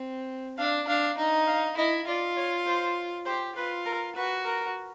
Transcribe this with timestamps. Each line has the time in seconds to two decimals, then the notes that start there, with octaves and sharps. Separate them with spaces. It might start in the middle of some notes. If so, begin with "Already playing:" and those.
Already playing: C4
0.58 D4 F5
0.88 D4 F5
1.18 D#4
1.47 F5
1.77 E4 D#5
2.07 F4 D5
2.37 C#5
2.66 C5
3.26 G4 C5
3.56 F4 B4
3.86 A#4
4.15 F#4 B4
4.45 A#4